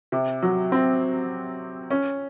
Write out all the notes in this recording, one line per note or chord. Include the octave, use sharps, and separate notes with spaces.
C3
F#3
C4
C#4